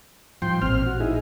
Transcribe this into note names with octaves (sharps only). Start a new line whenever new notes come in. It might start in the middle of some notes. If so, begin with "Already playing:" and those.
G#2 F3 G3 G5 C6
A1 A#2 C4 F6
F#4
D#4 E4 G#4